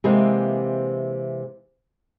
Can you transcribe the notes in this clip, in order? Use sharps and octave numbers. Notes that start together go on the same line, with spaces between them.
C3 E3 G#3 A#3 C4